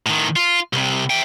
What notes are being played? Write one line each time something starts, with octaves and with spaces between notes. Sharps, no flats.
A2 D#3
F4
C2 C3
E5 G5